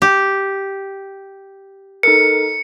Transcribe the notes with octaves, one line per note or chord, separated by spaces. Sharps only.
G4
D#4 A4 A#4 C#7